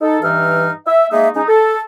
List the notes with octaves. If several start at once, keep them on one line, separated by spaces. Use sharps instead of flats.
D#4 A4
G2 E3 D#4 E5 F6
E5
G#3 A#3 D#4 D#5 E5
G#3 C#4 D#4
A4